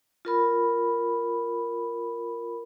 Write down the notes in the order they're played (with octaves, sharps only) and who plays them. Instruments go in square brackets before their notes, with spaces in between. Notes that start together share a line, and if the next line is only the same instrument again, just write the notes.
[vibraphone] F4 A#4 B5